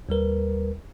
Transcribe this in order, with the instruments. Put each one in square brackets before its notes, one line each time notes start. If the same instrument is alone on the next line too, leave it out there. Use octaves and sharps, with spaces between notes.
[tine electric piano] D#2 G3 A#4 B4